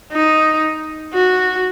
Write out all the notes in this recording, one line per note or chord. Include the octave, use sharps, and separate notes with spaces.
D#4
F#4